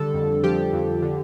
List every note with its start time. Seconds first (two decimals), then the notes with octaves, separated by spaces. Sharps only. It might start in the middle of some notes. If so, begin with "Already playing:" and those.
Already playing: D3 G3 A4
0.14 F2
0.43 F3 G4
0.73 F2
1.02 D3